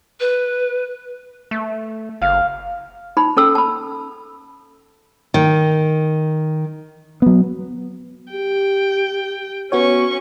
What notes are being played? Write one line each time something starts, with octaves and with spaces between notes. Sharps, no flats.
B4
A3
F#1 F5
D#4 B5
C#4 A4 E6
A5 B5
D#3
F#3 B3
G4 G5
B3 C#4 F#4 C#5 C#6